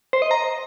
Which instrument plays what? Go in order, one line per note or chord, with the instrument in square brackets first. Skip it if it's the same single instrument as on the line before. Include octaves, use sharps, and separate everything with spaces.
[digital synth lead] C5
D#5
A#5